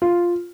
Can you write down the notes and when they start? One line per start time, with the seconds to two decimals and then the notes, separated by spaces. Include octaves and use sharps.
0.02 F4